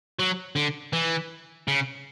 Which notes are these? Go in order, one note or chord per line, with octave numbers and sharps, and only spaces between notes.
F#3
D3
E3
C#3